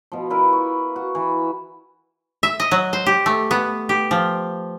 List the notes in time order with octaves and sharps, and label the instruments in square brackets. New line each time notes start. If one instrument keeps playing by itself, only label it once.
[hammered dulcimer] B2 F3
E4 A#4 B4 D5
F4 C#6
F#4
E3
[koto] E5
D#5
F#3
C5
G4
A3
B3
G4
F3